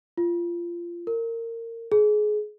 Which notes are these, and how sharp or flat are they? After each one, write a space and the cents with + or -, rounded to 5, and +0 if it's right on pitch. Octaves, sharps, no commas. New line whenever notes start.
F4 -20
A#4 -25
G#4 +25